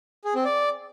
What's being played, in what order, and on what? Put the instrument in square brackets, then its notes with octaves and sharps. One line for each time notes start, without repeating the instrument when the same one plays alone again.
[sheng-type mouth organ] G#4
C4
D5